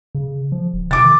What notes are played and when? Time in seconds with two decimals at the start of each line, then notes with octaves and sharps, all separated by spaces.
0.15 C#3
0.52 F3
0.74 D#1
0.91 C3 D6 A6
1.04 D#3